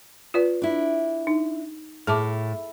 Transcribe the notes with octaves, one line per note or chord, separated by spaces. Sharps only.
F4 B4 D5
D4 E4
D#4
A2 G#4 A5 D6